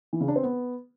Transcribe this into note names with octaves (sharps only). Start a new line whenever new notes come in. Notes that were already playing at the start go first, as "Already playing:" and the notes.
E3
C#3
D4
C4
B3